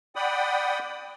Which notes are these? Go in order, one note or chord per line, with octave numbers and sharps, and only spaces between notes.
D5 F#5 G5 B5 D#6